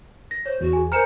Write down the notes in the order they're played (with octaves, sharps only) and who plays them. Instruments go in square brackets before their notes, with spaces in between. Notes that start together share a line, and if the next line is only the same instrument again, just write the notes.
[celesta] A#6
[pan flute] C5 [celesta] C#5
[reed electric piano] E2 [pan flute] F#4
[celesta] G#4 G#5
[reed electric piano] A#4 G#5 A#5 [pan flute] C5 [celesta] F6 C#7 E7